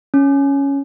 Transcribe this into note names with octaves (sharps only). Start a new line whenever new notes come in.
C#4